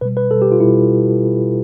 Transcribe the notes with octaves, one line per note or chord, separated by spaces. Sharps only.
B2 G3 B4
B4
B2 G3 A4
G4
F4
B2 G3 E4